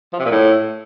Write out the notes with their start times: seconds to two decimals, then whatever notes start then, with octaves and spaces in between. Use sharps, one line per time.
0.13 F3
0.19 C3
0.25 A#2
0.31 A2